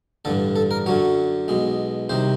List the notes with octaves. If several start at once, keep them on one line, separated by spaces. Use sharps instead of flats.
A1 G2 D3 A4
A4
A#4
F#2 D3 F#3 C#5
B1 B2 G#3
C2 C3 D#3 C5